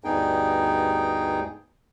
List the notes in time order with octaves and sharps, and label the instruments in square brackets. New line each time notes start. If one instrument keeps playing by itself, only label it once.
[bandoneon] D2 G2 B3 D#4 G#4 G5